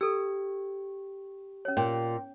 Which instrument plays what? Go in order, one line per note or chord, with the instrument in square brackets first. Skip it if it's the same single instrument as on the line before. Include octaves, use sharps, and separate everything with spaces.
[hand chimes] G4 [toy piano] A4 E6
[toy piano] C#4 C#5
[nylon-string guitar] A#2 [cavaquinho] G5